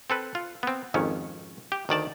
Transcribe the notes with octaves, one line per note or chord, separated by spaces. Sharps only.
C4 A4 B4
F4
B3 C4
G#1 F2 D#3 C#4
G4
D2 D#3 D5 A5